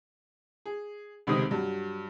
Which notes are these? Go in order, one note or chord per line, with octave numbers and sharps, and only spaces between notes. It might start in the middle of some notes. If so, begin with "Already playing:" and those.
G#4
F1 C#2 C3 D#3 C4 D#6
G2 F#3